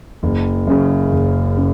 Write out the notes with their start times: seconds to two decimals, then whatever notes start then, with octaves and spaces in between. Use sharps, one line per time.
0.23 F#1
0.67 F#2 C#3
1.12 F#1
1.57 C#3